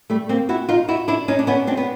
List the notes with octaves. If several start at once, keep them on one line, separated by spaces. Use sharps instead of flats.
G3 A3
A#3 C4
E4 F#4
D#4 F4
E4 F#4
D4 E4
C#4 D#4
D4
B3 C#4
C4 D4
B3